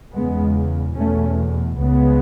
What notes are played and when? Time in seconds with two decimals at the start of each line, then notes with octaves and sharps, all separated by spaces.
0.14 E2 C#3 G#3 B3
0.97 E2 B2 A3 C#4
1.80 C#2 C#3 G#3 B3